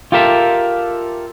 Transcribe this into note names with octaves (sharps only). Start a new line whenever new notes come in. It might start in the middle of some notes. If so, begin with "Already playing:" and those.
F4 G4 A4 A#4 E5